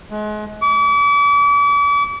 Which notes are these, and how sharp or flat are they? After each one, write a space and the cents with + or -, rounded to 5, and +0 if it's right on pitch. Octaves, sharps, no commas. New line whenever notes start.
G#3 +35
D6 -40